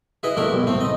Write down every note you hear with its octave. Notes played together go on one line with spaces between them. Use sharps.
E4 G#4 B4 D#5
A#1 A3 D4 E4 A#4 G5
B1
A2 A3 C4
D#4 D#5